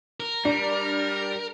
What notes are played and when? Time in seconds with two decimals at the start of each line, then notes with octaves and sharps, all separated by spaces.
0.20 A#4
0.45 G3 D4